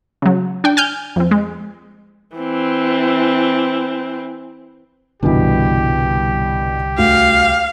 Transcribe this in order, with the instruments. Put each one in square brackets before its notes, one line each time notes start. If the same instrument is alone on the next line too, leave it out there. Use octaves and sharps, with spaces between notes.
[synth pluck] C#3 F#3
D4 G5
G#5 F6 G6
F2 C4
G#3
[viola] E3 C4
[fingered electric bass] C2 D3 [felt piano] G2 B2 E3 [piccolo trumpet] G4
[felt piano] D2 [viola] F5